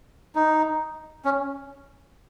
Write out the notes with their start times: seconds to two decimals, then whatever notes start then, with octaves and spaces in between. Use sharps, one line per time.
0.35 D#4
1.25 C#4